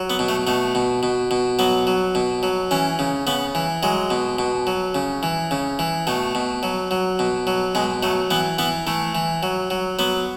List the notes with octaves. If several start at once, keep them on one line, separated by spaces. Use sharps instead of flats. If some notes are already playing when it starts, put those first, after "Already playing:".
Already playing: F#3
B3
B2
A3
B2 A3
B2
B2
B2
F#3 B3
F#3
B2
F#3
E3 C#4
C#3
C#3 B3
E3
F#3 G#3
B2
B2
F#3
C#3
E3
C#3
E3
B2 A3
B2
F#3
F#3
B2
F#3
B2 G#3
F#3 A3
E3 B3
E3 B3
E3 A3
E3
F#3
F#3
F#3 B3